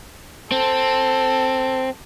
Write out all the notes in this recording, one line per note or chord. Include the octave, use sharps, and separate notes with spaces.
C4 A4